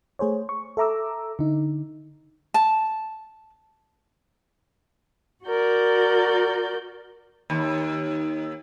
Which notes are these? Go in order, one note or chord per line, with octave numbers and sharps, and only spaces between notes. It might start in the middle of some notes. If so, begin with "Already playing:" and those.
A3 G#4 C5 C#5
C#6
A4 E5 A#5 D6 E6
D3 D#4
A5
F#4 A#4 D5 G6
D#2